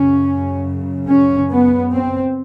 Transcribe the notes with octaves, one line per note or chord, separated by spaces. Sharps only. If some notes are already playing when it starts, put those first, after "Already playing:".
Already playing: F#2 C#3 C#4
C#4
B3
C4